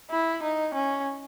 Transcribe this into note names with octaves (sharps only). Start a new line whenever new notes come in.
E4
D#4
C#4